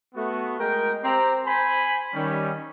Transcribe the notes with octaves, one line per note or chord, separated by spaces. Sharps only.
A3 B3 F#4
G#3 A#4 G5
C4 G4 A#5
C5 G#5 B5
D#3 G3 C#4